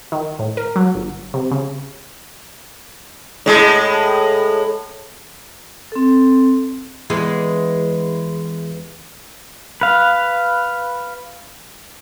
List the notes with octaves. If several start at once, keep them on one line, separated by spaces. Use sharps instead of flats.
D#3
A2
A#4
F#3
G1
C3
C#3
A2 G#3
C4 A4
E2 E3 G#3
B4 F5